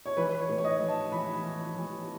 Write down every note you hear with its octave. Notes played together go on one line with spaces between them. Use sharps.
C#5
E3 B4
C#5
A2
C#5
D#5
E3
A5
E3 B5
E3
E3